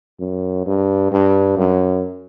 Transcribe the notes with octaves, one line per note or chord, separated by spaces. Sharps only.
F#2
G2
G2
F#2